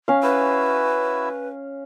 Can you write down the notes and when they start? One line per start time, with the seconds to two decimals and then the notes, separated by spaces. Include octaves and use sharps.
0.08 C#4 F5
0.23 E4 F#4 B4 E6